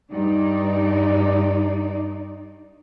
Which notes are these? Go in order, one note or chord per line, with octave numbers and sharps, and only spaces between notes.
G2 D#4 D5